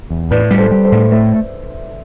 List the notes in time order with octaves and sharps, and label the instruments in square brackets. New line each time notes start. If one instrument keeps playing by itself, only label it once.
[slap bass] E2
[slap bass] A2 [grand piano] B4 D5
[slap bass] G3
[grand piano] A4 C5
[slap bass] G3
[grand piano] A4 C5
[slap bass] A2
[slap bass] A3 [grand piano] C5 E5